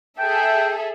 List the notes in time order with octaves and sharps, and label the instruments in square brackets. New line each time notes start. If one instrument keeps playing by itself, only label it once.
[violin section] G#4 A4 E5 [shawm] G5